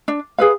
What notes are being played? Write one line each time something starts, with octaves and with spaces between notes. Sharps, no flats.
D4
G#4 B4 F5